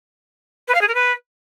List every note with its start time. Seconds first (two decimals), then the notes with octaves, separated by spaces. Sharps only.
0.68 B4
0.75 F5
0.81 G#4
0.88 A#4
0.95 B4